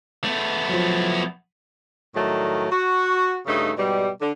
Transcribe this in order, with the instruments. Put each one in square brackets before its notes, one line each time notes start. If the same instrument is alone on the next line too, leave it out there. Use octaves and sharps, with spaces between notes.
[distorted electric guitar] A3 B3
[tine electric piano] F3 F#3
[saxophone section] A2 D#3 F#3 G3 A3
F#4
G2 C#3 A3 D#4
G#2 B2 G3
D3